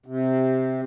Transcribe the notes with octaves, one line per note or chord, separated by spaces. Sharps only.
C3